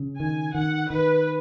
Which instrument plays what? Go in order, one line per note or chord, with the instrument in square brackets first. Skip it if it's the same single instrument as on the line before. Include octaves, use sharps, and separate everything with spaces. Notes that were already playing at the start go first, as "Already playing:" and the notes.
Already playing: [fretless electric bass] C#3
[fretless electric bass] D#3 [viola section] G#5
[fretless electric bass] D#3 [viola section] F#5
[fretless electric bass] D#3 [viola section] B4